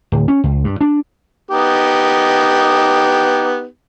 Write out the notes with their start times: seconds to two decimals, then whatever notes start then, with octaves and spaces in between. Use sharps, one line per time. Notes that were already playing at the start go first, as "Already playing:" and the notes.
0.12 D1
0.28 C#4
0.44 C#2
0.64 G2
0.81 D4
1.51 B3 D#4 G4